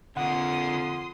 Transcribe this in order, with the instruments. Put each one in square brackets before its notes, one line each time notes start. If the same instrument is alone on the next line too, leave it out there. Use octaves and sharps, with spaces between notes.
[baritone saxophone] F2 [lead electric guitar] D3 A#3 [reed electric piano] F#5 [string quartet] C6 D#6